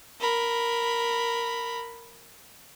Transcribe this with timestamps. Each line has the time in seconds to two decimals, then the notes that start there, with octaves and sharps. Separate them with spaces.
0.21 A#4 B5